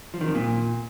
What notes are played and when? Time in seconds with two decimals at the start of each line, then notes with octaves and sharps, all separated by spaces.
0.14 F3
0.21 D#3
0.28 F2
0.35 A#2